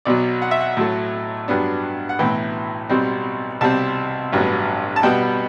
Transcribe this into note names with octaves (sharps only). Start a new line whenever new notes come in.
B1 B2 F#3 D5
F#5
E5
F#5
A2 F#3 A3
G2 F#3 B3 D4
F#5
B1 A2 E3 G5
B1 B2 G3 C4
C2 B2 G3 C4 A5
A1 G2 F#3 B3
A5
B2 G3 B3 G5